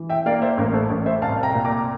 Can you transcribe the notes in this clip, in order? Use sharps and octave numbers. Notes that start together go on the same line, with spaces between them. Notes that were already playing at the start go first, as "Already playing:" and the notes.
Already playing: E3
E5 G5
A#3 D5 F5
C5 E5
A1 A#4
A4 C5
A1
C5 E5
C2 F5 A5
G5 A#5
A#2
A#5 D6